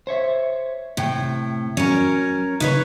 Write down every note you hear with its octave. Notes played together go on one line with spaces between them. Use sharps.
C5 C#5 E5
A2 C3 G5
F#3 C#4 A#4
C#3 D#4 B4 C#5